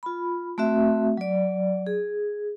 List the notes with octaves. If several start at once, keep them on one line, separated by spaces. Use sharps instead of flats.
F4 B5
A3 C4 F#4 E5
F#3 D5
G#4